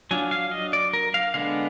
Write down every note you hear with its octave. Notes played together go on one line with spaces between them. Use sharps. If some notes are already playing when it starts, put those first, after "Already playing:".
F#3 D4 F4 G#5
F5
D#5
D5
A#4
F5
D3 G#3 B3 D4 F5